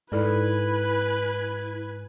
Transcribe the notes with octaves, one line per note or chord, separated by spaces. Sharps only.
G#2 D#4 E4 A4 B4 D5 G#5